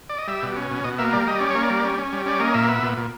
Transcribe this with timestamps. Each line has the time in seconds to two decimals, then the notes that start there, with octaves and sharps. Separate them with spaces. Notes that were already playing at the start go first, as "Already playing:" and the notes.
0.10 D5
0.18 D#5
0.28 G3 E5
0.43 B2
0.56 C#4
0.71 B2
0.84 B2 D#5
0.98 A#3 E5
1.13 G3 D5
1.27 G3 D#5
1.39 C#4 D5
1.50 C#5
1.55 A#3
1.63 D5
1.70 G3
1.84 C#4
1.98 C#4
2.13 G3
2.26 C#4 D5
2.40 A#3 D#5
2.54 A#2 E5
2.69 B3
2.83 A#2
2.98 A#2